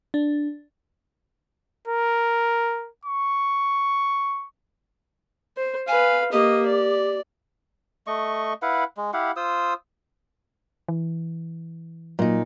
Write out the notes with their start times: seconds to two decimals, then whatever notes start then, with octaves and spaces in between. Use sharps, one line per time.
0.14 D4
1.88 A#4
3.05 C#6
5.57 C5
5.88 B4 F5 G#5
6.32 A#3 G4 D#5
6.66 D5
8.07 A3 D#5 C#6
8.62 E4 B4 F5 F#5
8.97 G#3
9.13 E4 G4 F5 F#5
9.36 F4 C5 D#6 E6
10.88 E3
12.19 A#2 F#3 D#4